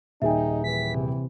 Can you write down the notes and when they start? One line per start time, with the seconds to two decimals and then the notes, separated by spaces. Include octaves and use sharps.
0.22 D#1 D#4 G#4 E5 G5 G#5
0.64 E3 B6
0.94 C3